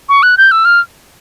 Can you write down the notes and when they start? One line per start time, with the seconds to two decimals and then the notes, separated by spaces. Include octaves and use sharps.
0.09 C#6
0.23 F#6
0.38 G6
0.52 E6
0.65 F6